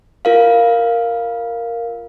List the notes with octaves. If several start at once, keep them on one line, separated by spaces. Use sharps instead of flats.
F4 A#4 F5